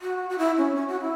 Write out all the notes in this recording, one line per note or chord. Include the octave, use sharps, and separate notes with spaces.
F#4
F#4
E4
C#4
C#4
F#4
E4